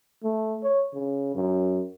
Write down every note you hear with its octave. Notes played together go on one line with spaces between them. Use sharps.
A3
C#5
C#3
F#2